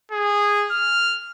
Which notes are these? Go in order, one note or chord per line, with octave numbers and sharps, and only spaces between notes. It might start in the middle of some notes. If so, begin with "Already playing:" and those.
G#4
F6